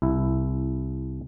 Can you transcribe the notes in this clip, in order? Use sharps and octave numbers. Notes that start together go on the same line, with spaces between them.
C2 E4